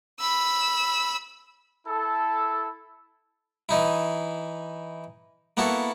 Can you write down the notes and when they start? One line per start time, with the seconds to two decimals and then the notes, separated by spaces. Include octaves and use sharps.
0.19 B5 E6
1.87 E4 A4
3.69 E3 D#4 E4
5.57 A#3 B3 E4 F#4 A4